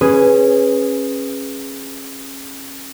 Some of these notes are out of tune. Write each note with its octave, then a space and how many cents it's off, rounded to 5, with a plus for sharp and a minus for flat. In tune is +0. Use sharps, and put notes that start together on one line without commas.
C#4 -25 G#4 +0 B4 +0